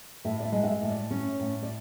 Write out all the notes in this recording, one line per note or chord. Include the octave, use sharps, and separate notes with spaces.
A2 E5
D5
E5
G#3
F#5
E5
A2
D5
C#4 C#5
A2
D5